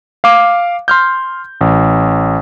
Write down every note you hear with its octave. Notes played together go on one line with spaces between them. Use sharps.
F5 D6
C6 F6 G6
A1